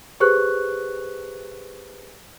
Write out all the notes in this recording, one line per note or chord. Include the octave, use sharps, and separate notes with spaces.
G4 G#4 B4 C5 C#6 F#6